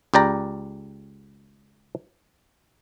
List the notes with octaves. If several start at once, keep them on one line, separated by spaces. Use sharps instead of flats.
C#2 G4 D5 A#5